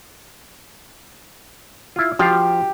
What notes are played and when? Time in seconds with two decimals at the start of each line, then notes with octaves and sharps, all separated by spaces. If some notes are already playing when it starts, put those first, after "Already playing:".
1.96 E4 F4
2.19 F3 G4 F5